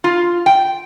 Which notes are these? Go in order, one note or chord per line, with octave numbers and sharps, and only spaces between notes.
F4
G5